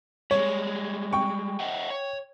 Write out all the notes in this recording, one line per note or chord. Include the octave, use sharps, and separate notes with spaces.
G3 G#3 C#5
G5 C#6
D#5 E5 F#5
C#5